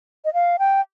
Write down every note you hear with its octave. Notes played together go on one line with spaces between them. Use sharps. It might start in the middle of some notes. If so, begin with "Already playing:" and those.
D#5
F5
G5